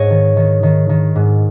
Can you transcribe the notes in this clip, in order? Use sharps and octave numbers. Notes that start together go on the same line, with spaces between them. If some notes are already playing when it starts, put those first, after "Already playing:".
Already playing: G#2 C#5 D#5
D#3
D#3
D#3
D#3
G#2